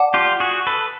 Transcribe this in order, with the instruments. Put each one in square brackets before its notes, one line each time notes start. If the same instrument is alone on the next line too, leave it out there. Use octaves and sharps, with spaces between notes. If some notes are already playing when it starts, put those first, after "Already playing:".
Already playing: [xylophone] D5 F#5 A5 D6
[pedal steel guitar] F4 G4
F#4 G#4
A4 B4